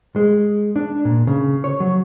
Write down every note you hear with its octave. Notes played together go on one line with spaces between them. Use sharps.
G#3
D4
A#2
C#3
C#5
F#3